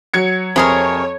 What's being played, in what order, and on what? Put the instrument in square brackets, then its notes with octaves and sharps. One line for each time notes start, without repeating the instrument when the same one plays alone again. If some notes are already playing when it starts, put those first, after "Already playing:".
[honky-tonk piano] F#3 G#6 C#7
[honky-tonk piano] F2 [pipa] C3 G#4 A#4 [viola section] C#5